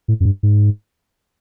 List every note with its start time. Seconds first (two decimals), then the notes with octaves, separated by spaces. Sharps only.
0.08 A2
0.20 F#2
0.25 G2
0.43 G#2